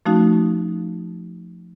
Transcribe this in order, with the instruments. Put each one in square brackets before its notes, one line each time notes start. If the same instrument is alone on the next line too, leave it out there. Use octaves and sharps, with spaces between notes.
[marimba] F3 A3 C#4 D#4 F#4